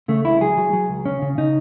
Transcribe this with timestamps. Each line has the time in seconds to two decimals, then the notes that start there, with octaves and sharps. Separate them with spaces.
0.08 C#3 A3
0.25 C#2 E4
0.41 F#3 G#4
0.57 F#3
0.73 F#3
0.89 C#2
1.06 C#3 C#4
1.22 C#3
1.38 C#3 D#4